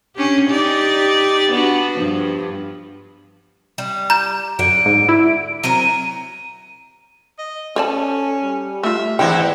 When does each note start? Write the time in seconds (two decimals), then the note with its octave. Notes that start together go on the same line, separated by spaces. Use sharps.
0.16 C#4 D4 G4
0.49 D#4 G4 D5
1.50 B3 D4 F#4
1.97 G2 F3
3.78 G3
4.10 A#5 G6 E7
4.59 F#2 D3 F#5 D7
4.86 G#2
5.09 E4
5.63 F#3 C4 A#4 D#7
7.39 D#5
7.76 C#4 A4 C5 D5 A5
8.43 G3
8.83 A3 F4 E5
9.19 E2 G#2 C4 E4 C5 D#5 F#5 G5